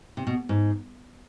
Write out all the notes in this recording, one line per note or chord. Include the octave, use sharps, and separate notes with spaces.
C3
B2
G#2